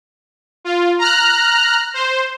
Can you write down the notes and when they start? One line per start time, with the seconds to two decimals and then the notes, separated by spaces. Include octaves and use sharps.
0.65 F4
0.99 A#5 F6 F#6
1.94 C5